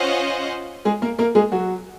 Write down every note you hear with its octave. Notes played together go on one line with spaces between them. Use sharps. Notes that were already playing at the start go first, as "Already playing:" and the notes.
Already playing: C#4 F4 C5 D#5 F#5
G#3 G#4
A#3 A#4
A#3 A#4
G#3 G#4
F#3 F#4